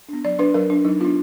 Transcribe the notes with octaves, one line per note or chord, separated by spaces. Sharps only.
B3 D4
F#3 D5
D4 B4
F#3 A#4
D4
F#3 D#4
B3 D4 F4